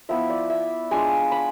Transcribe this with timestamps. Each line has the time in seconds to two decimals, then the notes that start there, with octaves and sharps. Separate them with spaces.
0.09 F3 B3 E4 E5
0.30 D5
0.50 E5
0.91 G#3 D4 F4 G#5
1.31 B5